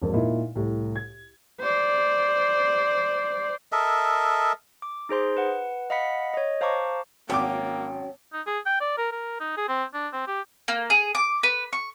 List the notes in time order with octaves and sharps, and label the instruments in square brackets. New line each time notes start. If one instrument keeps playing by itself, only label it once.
[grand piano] E1 F2 A#4
A#2 D#4 E4 A#4
C2 A2
G#6
[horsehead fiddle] C5 D5
[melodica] A4 A#4 D#5 E5
[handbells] D6
D#4 G#4 C5 C6
B4 F#5
D#5 F5 F#5 B5 B6 C#7
C#5 D#5
C5 F5 A5 A#5 C#6 D6
[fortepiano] G#1 D6 [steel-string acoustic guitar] F#3 C#4 [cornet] A#3 [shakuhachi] G5
[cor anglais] D#4
G#4
G5
D5
A#4
A#4
D#4
G#4
C4
D4
C4
G4
[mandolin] A#3
G#4
D6
B4
C#6